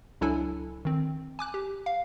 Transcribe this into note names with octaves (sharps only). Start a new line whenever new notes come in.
C#2 F#3 D4 E4 A4 G#5
D#3 C4
G#5 D6 F#6
G4
F5